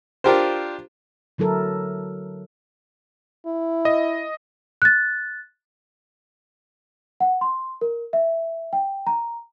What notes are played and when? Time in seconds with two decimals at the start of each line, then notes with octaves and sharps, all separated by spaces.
0.24 D4 F4 G4 A#4 C5
1.38 D3 F#3 E4 A4 A#4
3.46 E4
3.85 D#5
4.82 F#6 A6
7.20 F#5
7.41 C6
7.81 A#4
8.13 E5
8.73 G5
9.07 A#5